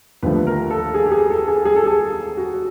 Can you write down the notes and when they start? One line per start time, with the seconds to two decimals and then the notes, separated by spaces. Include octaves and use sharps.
0.23 D#2 D3 F3 A3 B4
0.47 A#4
0.70 A4
0.94 G#4
1.06 G4
1.12 G#4
1.30 A4
1.48 G#4
1.65 G#4
1.76 A4
1.86 G#4
2.37 F#4